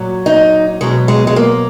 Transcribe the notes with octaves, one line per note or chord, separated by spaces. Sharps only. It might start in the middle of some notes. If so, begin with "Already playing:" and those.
Already playing: A#2 F#3
D#4
B2 F#3 G#3
G#3
G#3
A#3